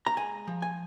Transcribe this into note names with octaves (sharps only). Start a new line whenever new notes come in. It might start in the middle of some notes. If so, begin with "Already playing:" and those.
A#5
G#3 G#5
F3
G#5